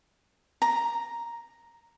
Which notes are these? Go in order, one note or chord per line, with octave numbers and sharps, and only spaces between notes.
A#5